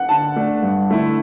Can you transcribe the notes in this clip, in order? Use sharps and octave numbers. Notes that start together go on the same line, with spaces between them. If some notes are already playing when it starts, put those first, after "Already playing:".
Already playing: F#5
D3 A5
A3 D4
G2
D3 A3 E4